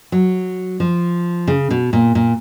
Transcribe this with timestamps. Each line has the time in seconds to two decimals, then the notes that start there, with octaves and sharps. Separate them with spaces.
0.12 F#3
0.80 F3
1.47 C#3
1.71 B2
1.93 A#2
2.15 A#2